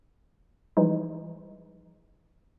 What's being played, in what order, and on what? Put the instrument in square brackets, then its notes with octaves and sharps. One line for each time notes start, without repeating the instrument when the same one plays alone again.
[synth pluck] E3 F3 G3 G#3 D#4